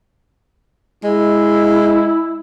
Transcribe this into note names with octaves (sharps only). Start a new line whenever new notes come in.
G#3 E4